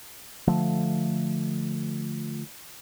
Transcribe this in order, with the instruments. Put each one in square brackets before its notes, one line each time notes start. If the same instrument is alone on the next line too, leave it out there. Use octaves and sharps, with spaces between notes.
[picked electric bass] D3 F3 A3